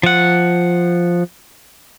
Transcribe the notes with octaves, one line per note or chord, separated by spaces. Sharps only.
F3 F#5